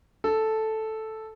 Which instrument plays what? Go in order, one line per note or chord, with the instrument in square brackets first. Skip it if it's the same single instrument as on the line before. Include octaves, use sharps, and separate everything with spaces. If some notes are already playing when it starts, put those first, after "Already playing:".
[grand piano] A4